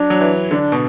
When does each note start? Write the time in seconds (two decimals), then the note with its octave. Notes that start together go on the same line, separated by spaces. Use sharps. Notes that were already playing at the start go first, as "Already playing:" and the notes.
Already playing: F#3 D4
0.10 F#3
0.21 E3
0.51 D3 D4
0.72 B2